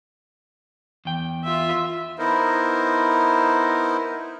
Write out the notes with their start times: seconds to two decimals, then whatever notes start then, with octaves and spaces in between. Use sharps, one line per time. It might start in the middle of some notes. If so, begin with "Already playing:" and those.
1.05 E2 G5
1.44 F4 E5
2.19 B3 D#4 E4 A#4 C5